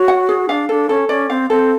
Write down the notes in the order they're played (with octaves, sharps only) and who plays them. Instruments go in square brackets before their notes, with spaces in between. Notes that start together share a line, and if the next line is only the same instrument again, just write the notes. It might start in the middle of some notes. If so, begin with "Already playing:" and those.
Already playing: [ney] F#4 [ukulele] C#5
[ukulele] F#5
G#4
[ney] D4 [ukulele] F5
[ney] D4 [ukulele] A4
[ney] C#4 [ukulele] A4
[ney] C#4 [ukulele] D5
[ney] C4 [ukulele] F5
[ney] C4 [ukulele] A4